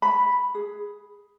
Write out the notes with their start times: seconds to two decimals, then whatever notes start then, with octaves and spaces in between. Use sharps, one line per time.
0.02 B5
0.55 G#4